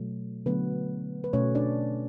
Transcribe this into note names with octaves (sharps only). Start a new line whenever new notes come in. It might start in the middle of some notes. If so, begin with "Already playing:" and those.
Already playing: B2 F#3 A3
D3 F#3 A3 B3 B4
B4
B2 A3 C#4 C#5
D4 D5